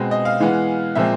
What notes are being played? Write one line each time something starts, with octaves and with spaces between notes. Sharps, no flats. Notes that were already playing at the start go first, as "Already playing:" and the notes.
Already playing: B2 G#3 C4
D#5
F5
E3 G#3 B3
A#2 F3 G#3 C4 E5